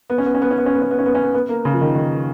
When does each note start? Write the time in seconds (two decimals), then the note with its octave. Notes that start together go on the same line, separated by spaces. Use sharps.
0.10 B3
0.18 C#4
0.26 B3
0.35 C#4
0.42 B3
0.51 C#4
0.58 B3
0.66 C#4
0.75 B3
0.82 C#4
0.91 B3
0.99 C#4
1.06 B3
1.15 C#4
1.23 B3
1.34 B3
1.49 A#3
1.65 C#3
1.74 F3
1.81 D#3
1.95 D#3